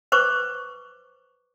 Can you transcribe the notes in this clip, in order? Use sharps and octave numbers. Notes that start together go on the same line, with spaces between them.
B4 C5 C#6 D6